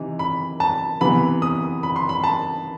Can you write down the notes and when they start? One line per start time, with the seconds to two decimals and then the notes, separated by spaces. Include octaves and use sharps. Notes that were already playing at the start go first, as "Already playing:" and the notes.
Already playing: C3 E3 D#4
0.19 B5
0.60 A5
1.01 C3 E3 B3 B5
1.42 D#6
1.83 B5
1.96 C6
2.09 B5
2.24 A5